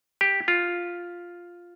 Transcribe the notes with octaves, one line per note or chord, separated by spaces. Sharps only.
G4
F4